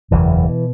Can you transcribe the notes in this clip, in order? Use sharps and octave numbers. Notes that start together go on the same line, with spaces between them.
F#1 E2 B2 E3
B2